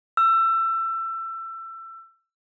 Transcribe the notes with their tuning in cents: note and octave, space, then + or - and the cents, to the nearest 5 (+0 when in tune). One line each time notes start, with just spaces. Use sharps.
E6 +25